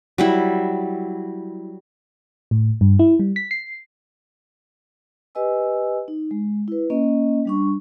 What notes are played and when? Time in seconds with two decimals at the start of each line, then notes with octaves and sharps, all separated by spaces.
0.18 F#3 G3 E4
2.51 A2
2.81 G2
2.99 E4
3.20 G3
3.36 B6
3.51 C7
5.35 G4 B4 D#5 G#5 E6
6.08 D#4
6.31 G#3
6.68 E4 B4
6.90 A#3 C#4 D#5
7.45 G3 D4 C#6